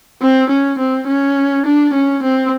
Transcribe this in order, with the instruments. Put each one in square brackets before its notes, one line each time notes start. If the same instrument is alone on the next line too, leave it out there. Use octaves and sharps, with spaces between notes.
[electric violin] C4
C#4
C4
C#4
D4
C#4
C4